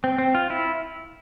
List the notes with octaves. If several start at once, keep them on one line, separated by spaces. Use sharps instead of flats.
C4
C4
F4
E4